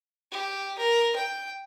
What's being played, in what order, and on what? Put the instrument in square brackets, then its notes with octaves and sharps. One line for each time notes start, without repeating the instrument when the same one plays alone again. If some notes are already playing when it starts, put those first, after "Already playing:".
[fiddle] G4
A#4
G5